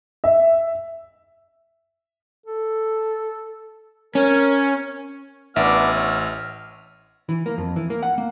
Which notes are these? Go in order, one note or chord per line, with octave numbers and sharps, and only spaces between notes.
E5
A4
C#4 A#4
A1 B3 D4 E5 D6 E6 F6
C#5
E3
A#3
F2
E3
A#3
F#5
A#3